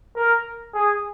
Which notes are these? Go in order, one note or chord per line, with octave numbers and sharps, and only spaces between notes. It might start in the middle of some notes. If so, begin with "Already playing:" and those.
A#4
G#4